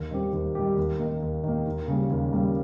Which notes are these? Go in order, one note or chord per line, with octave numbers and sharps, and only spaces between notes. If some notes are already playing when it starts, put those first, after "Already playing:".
Already playing: D#2
D#3 G3 C4 G4
D#2
D#3 G3 C4 G4
D#2
D#3 A#3
D#2
D#3 A#3
D#2
C#3 G3 A#3
D#2
C#3 G3 A#3